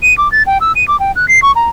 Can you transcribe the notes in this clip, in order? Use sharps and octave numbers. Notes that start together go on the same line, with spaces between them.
D#7
D6
A6
G5
E6
D#7
D6
G5
F#6
C7
C#6
A#5